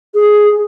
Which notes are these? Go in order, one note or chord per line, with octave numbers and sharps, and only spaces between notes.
G#4